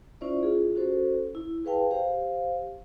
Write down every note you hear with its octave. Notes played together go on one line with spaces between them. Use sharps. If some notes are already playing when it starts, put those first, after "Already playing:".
C#4 E4 F4 C5 D5 E5
F4 G#4
C#4 F#4 A4 C5
E4
G#4 B4 F5 G5 A5
G4 C5 F5